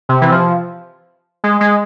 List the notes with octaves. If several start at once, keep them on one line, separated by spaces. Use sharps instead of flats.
C3
E3
F3
G#3
G#3